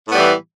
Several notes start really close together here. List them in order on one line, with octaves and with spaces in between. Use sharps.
A2 B3 G3 E3